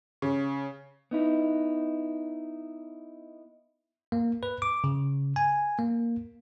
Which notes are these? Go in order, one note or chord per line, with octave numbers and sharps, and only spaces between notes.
C#3
B3 D#4 E4
A#3
B4
D6
C#3
G#5
A#3